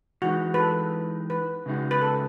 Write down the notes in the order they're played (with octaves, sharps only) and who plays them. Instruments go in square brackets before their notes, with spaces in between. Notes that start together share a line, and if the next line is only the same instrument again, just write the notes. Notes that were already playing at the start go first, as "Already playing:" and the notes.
[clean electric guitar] E3 G#3 D#4 [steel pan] F#4
[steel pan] B4
A4
B4
[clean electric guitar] C#3 G#3 D#4 F#4
[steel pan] B4
A4